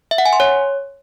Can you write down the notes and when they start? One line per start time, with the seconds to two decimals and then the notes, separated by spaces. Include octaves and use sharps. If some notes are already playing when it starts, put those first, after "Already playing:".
0.11 E5
0.18 F#5
0.26 G#5
0.33 C6
0.40 C#5